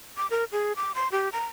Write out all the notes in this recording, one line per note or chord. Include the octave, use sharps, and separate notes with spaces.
D6
A#4
G#4
D6
C6
G4
A#5